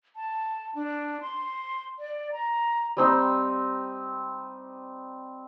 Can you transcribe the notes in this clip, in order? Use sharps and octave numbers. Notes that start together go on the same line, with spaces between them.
A5
D4
C6
D5
A#5
G3 C4 D#4